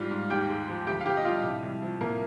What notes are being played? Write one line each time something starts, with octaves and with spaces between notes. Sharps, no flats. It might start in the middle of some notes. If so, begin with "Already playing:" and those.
Already playing: G#2 G3 F4 F5
G#2
D#2 G4 G5
G#3
F3
D2 G4 G5
F5
D2 G4 G5
D#5
G3 F4 F5
C2
C2
F3
C2 A#3 A#4